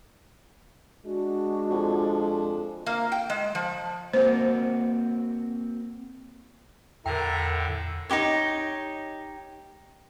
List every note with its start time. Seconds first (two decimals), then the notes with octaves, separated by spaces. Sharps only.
1.05 G#3 D4 F#4
1.70 F2
2.86 A#3
3.12 G5
3.30 G#3
3.55 F3
4.13 A#3 C4 F#4 C5
7.06 E2 A2 D3 A#4 E5 G5 A#5
8.09 D#4 E4 G4 C#5